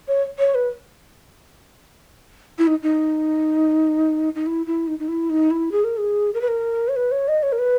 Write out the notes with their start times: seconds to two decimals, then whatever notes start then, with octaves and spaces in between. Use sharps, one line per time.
0.08 C#5
0.39 C#5
0.55 B4
2.58 E4
2.67 D#4
2.83 D#4
4.35 D#4
4.46 E4
4.66 E4
4.88 D#4
4.99 D#4
5.08 E4
5.30 D#4
5.51 E4
5.72 G#4
5.84 A#4
5.97 G#4
6.34 A#4
6.41 B4
6.48 A#4
6.88 C#5
6.96 B4
7.11 C#5
7.28 D#5
7.43 C#5
7.52 A#4
7.59 B4